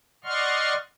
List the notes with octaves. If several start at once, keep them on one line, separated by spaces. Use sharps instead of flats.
D5 D#5 F#5 C6 C#6 F6